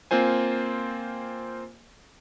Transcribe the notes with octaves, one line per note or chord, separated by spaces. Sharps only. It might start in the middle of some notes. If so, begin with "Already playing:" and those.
A#3 C4 F4 C5 G#5